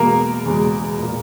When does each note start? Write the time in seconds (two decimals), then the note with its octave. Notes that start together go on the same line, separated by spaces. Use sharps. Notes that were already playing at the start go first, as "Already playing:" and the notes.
Already playing: E2 B2 G#3 A#3 A#4
0.46 E2 B2 G#3
0.99 A#2 A#3